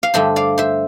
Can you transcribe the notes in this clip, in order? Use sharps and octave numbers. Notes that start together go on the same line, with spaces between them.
F5
G2 D3 A3 C5 E5
D5 F5
C5 E5